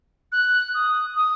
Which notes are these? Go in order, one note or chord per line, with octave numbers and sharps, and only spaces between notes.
F#6
D#6
D#6